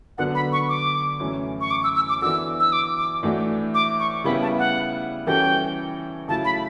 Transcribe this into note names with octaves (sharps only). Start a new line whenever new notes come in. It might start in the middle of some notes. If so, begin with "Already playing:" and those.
D3 F#3 B3 D4 A4 F#5
B5
C#6
D6
F#2 E3 A3 C#4 E4
C#6
D6
E6
E6
D6
E3 B3 D4 F#4 A4 E6
E6
D6
D6
A2 E3 A3 D4 F#4
D6
C#6
C#3 G3 B3 E4 B5
A5
F#5
E3 G3 C#4 F#4 A4 G5
C#3 F#3 A3 E4 A5
B5